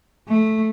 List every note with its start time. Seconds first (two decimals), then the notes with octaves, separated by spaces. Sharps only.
0.28 A3